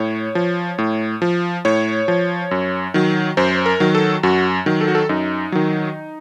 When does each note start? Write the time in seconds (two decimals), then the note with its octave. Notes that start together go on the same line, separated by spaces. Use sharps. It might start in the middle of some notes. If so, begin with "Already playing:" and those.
Already playing: A2 C#5
0.35 F3
0.78 A2
1.22 F3
1.65 A2 C#5
2.08 F3
2.51 F#2
2.94 D#3 F#3
3.37 F#2 C5
3.66 A#4
3.80 D#3 F#3
3.95 A4
4.23 F#2 F#4
4.66 D#3 F#3
4.81 A4
4.88 F#4
4.95 A4
5.09 F#2 D#4
5.52 D#3 F#3